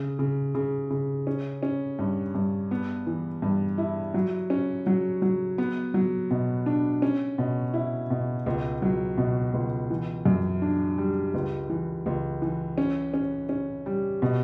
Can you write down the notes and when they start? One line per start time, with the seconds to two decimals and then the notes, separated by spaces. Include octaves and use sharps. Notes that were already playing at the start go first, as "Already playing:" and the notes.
Already playing: C#3
0.19 C#3
0.55 C#3
0.90 C#3
1.27 C#4
1.63 C#4
1.99 G2
2.35 G2
2.71 B3
3.07 E3
3.42 G2
3.78 E4
4.14 F#3
4.50 C#4
4.87 F#3
5.22 F#3
5.58 B3
5.94 F#3
6.31 B2
6.66 D4
7.02 C#4
7.38 B2
7.74 E4
8.10 B2
8.46 C#2
8.82 F#3
9.18 B2
9.54 C#2
9.90 E3
10.26 F#2
10.62 D4
10.98 G3
11.34 C#2
11.70 E3
12.06 C#2
12.42 E3
12.78 C#4
13.14 C#4
13.49 C#4
13.86 G3
14.22 B2